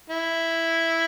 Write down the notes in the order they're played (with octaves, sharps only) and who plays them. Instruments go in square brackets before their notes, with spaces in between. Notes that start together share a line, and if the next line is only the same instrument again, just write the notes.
[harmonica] E4